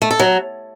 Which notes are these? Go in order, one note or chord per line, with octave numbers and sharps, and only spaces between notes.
A3
A4
F#3